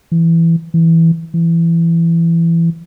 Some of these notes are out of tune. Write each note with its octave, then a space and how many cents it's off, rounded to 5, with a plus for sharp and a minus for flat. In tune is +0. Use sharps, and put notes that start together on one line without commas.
E3 +10
E3 -5
E3 +20